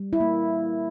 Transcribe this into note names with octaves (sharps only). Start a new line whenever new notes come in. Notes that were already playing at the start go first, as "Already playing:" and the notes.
Already playing: G3
E4
A#3